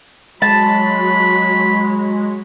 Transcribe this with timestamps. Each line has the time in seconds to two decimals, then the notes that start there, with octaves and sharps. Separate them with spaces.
0.42 F#3 G#3 F#4 C#5 A5 B5